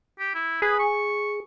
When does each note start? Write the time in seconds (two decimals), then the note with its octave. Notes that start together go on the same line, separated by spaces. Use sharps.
0.19 G4
0.35 E4
0.62 G#4 B4
0.79 C#6